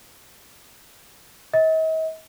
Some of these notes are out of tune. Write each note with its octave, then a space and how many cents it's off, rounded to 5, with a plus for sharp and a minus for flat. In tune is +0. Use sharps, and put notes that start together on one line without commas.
D#5 +45